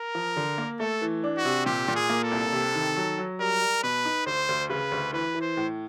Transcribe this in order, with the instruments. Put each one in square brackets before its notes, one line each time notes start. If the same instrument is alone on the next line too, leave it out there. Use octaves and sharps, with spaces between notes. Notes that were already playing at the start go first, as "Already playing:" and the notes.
Already playing: [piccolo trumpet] A#4
[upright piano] F3
D3
A#3
[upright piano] A3 [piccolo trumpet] A4
[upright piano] E3
D4
[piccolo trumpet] F#4
[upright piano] C3
[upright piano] A#2 [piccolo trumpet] G4
[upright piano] A#2
[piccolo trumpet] G#4
[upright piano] A#3
[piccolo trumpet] A4
[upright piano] C2
C3
D#3
F#3
F#3
[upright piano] G3 [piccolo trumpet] A#4
[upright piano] G3
[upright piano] B2 [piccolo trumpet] B4
[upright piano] D#4
[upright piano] D2 [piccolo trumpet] C5
[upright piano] D2
[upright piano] C#3 [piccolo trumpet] B4
[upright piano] D2
[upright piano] E3 [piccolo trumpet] B4
[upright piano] E3
[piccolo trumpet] C5
[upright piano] A2